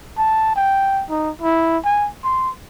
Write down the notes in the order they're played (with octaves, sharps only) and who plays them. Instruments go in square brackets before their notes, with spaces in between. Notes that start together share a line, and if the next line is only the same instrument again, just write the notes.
[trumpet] A5
G5
D#4
E4
G#5
C6